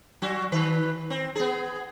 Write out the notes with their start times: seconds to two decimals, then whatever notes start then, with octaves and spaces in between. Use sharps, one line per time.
0.22 F#3 F#4
0.52 D#3 B4
1.10 C4
1.35 B3 G#4